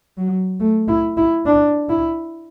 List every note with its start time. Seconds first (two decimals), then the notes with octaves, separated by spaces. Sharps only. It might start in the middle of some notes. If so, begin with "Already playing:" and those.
0.17 F#3
0.60 A3
0.88 E4
1.17 E4
1.46 D4
1.89 E4